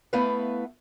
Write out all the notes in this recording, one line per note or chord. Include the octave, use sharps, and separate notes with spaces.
A3 B3 E4 B4 F5